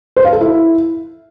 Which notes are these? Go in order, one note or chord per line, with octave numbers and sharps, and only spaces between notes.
C5
F5
A4
E4